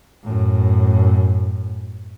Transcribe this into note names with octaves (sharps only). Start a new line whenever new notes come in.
F#2 A2